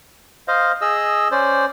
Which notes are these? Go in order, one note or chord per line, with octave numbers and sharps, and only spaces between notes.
C5 D#5 F5
G#4 D#5 E6
C#4 C5 D5